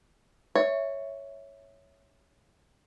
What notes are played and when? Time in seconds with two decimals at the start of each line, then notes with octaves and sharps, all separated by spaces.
0.55 C#5 E5